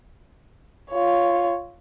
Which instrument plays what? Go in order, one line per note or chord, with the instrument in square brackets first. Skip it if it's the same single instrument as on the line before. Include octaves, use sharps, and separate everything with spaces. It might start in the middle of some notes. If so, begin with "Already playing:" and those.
[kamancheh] F4 C#5